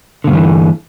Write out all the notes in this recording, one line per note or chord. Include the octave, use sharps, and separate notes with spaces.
G2 A#2 D3 E3